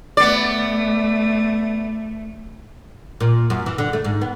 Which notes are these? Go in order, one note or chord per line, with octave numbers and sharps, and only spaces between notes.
A3 B3 D5
A#2
F#2
E3
D3
A3
G#2
B3